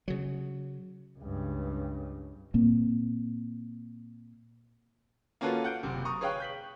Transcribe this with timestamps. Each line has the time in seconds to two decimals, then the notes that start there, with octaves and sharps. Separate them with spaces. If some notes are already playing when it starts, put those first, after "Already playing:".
0.08 C#3 F#3
1.19 C#2 G2
2.54 A#2 A#3 C4
5.41 A#3 C#4 F4 F#4 A4 B4
5.64 F#5 G6 D7
5.83 F#1 C3
6.05 A#5 C#6 D#6
6.21 G#4 B4 C#5 F5 G5 F#6
6.40 G6 B6 F#7